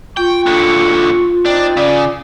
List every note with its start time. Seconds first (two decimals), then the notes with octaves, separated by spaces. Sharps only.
0.17 F4 G5 C#6
0.46 D#2 D3
1.46 C4 D4 D#4
1.77 C#3 D5